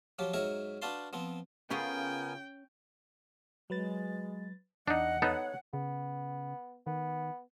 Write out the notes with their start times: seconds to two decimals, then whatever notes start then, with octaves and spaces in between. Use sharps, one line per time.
0.19 F3 F#3 F4 G4
0.34 G#2 F#3 A#4 C#5 E5 C#6
0.82 D4 F#4 B4 F5 A5 C6
1.13 F3 B3 C4
1.70 C#3 B3 C#4 F4 G#4 A#4 G5 G#5
3.70 F#3 G#3 B4 A6
4.88 E2 D4 D#4 D#5 F#5
5.22 B3 D#4 A4 C#5
5.73 C#3 B3
6.87 D#3 B3